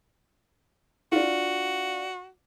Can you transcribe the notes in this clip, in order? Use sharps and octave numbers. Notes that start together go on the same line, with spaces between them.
D4 F4 F#4